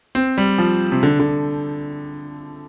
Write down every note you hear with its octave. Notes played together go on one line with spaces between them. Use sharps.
C4
G3
F3
C3
D3
D3